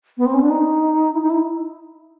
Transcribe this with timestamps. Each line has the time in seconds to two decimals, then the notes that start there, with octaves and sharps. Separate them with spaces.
0.18 B3
0.26 C4
0.34 C#4
0.42 D4
0.50 D#4
1.13 E4
1.21 D#4
1.30 E4